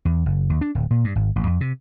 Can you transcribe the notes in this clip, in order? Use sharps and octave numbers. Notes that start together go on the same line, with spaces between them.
E2
F#1
D#2
D4
D1
A#2
G2
G#1
A1
F2
C3